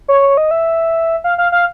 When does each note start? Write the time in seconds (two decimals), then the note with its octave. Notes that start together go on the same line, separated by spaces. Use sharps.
0.08 C#5
0.37 D#5
0.51 E5
1.24 F5
1.38 F5
1.52 F5